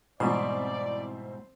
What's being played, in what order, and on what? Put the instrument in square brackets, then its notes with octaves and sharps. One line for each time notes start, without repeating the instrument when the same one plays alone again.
[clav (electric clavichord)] G#2 B2 [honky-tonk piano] E3 G3 C4 [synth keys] C5 [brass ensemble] D5